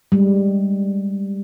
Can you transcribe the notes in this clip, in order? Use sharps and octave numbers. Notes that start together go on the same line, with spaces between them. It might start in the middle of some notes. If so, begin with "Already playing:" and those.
G3 G#3